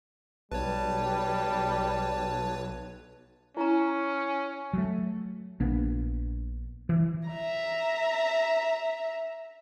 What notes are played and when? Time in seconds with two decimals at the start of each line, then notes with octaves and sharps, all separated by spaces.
0.52 B1 G3 B4 C#5 A5
3.57 C#4 E4 A#5
4.73 F#3 A3
5.60 A#1 A#3 B3 D4
6.89 E3
7.29 E5 A#5